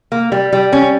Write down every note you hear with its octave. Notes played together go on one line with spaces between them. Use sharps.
A#3
G3
G3
C#4